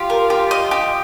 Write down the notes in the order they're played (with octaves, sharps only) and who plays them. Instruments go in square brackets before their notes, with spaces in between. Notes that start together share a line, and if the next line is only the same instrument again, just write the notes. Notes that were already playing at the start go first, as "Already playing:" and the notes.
Already playing: [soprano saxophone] F4 [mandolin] G4
[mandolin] A#4
G4
D#5
G4